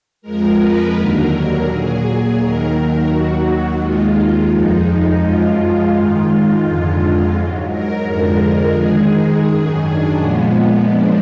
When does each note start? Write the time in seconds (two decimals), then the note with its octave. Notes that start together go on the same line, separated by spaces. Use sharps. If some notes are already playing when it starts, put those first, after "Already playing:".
0.21 F2 F3 G#3 A#4
0.57 B4
0.93 D#2 D3 F#3 A#4
1.64 A#2 F#3 G#4
2.34 D#2 D#3 F#3 A#4
3.06 D#2 D#3 F#3 F#4
3.77 D#2 D#3 G#3 F4
4.48 F2 F3 G#3 D#4
5.19 F#2 F3 G#3 F4
5.90 G#2 D#3 G#3
6.61 F2 D3 G#3 F4
7.32 G#2 F#3
7.67 A#4
8.03 F2 D3 F3 G#3 A#4
8.38 A#4
8.74 G#2 D#3 G#3 G#4
9.45 F#2 D#3 F#3 G#4
9.81 D4
10.15 A#2 F3 G#3 B3
10.86 F#2 F3 G#3 D4